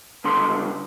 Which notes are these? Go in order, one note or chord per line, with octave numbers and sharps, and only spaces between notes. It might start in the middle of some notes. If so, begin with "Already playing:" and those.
C#2 G2 D3 C6